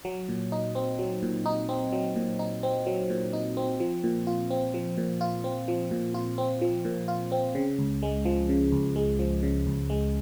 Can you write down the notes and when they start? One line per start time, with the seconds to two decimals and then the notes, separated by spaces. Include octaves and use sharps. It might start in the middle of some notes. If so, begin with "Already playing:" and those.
0.05 F#3
0.29 A#2
0.52 D#4
0.75 C4
0.99 F#3
1.23 A#2
1.46 D#4
1.69 C4
1.92 F#3
2.16 A#2
2.39 D#4
2.63 C4
2.87 F#3
3.10 A#2
3.33 D#4
3.57 C4
3.80 F3
4.04 A#2
4.27 F4
4.50 C4
4.74 F3
4.98 A#2
5.21 F4
5.44 C4
5.68 F3
5.91 A#2
6.14 F4
6.38 C4
6.61 F3
6.85 A#2
7.08 F4
7.32 C4
7.55 C#3
7.79 C#2
8.02 G#3
8.25 F3
8.49 C#3
8.72 C#2
8.96 G#3
9.19 F3
9.43 C#3
9.66 C#2
9.90 G#3